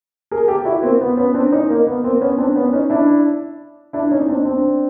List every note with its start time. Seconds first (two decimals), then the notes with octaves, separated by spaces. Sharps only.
0.31 G#4 A#4
0.48 G4 A4
0.65 E4 F#4
0.82 A#3 C4
1.01 B3
1.17 B3 C#4
1.34 C4 D4
1.52 C#4 D#4
1.70 A#3
1.87 B3
2.04 A#3 C4
2.21 B3 C#4
2.38 C4 D4
2.55 B3 C#4
2.73 C#4 D#4
2.90 D4 E4
3.93 D4 E4
4.11 C#4 D#4
4.29 C4 D4
4.45 C4 D4